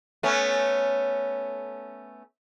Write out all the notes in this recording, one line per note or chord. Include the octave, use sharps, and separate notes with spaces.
A3 B3 C#4